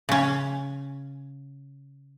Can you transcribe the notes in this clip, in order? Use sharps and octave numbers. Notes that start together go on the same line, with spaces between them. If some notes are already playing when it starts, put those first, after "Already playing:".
C#3 C#4